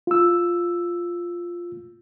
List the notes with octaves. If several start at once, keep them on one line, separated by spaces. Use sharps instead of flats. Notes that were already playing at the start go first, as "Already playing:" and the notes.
F4 E6